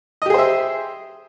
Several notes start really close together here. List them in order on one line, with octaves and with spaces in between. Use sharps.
D#5 G4 G#4 C5 E5